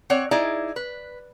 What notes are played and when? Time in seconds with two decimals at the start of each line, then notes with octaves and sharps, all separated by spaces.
0.10 C4 C#5 D5 F#5
0.31 D#4 E4 G#4 D5
0.76 B4